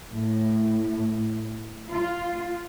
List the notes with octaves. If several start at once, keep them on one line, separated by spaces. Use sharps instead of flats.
A2
F4